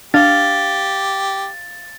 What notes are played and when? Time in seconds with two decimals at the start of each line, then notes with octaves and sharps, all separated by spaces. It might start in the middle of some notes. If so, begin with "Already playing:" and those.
0.14 D4 G4 F5 A6